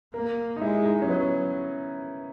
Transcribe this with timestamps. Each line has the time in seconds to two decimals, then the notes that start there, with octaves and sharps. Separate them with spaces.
0.14 A#3 A#4
0.56 D#4
0.62 G#3 E4
0.85 D#4
1.02 C#4
1.08 F#3 B3